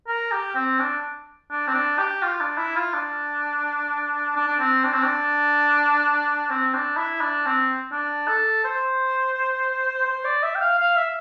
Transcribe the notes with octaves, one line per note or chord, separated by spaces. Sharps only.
A#4
G4
C4
D4
D4
C4
D4
G4
F4
D4
E4
F4
D4
D4
D4
C4
D4
C4
D4
C4
D4
E4
D4
C4
D4
A4
C5
C5
D5
E5
G5
F5
F5
E5